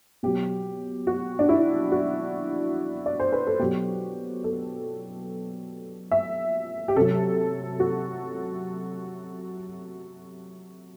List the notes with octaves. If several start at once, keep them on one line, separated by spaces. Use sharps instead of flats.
B2 F#3 G4
F#4
D4
E4
F#4
D5
C5
B4
A4
B2 F#3 G4
A4
E5
G4
C3 F#3 A4
F#4